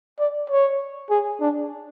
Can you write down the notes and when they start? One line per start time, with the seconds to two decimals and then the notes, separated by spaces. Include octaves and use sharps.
0.19 D5
0.50 C#5
1.10 G#4
1.41 D4